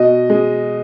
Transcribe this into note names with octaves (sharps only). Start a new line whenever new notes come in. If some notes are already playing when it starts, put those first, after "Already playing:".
Already playing: B2 D#5
G#3